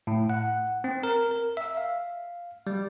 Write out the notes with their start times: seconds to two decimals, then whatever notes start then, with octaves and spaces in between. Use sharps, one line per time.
0.07 A2
0.30 F#5
0.84 C4
1.03 A#4
1.31 A#4
1.57 E5
1.77 F5
2.67 G3